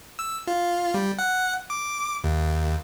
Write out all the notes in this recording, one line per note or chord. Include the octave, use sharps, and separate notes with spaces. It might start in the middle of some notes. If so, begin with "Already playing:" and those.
E6
F4
G3
F#5
D6
D#2